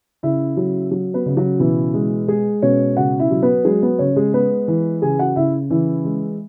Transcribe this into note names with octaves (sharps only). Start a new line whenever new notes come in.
C#3 E4 E5
F#3
F#3
B3 B4
C#3
F#3 F#4
B2 E3 E4
G#3
G#3 G#4
B2 C#4 C#5
C#3 F#4 F#5
E4 E5
F#3
B3 B4
F#3 G#3 G#4
B3 B4
C#3 C#4 C#5
G#3 G#4
G#3 B3 B4
E3
C#3 G#4 G#5
F#4 F#5
C#3 E4 E5
C#3 E3 E4
G#3